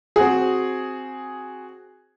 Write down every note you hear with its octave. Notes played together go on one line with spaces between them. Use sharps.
C4 F#4 G#4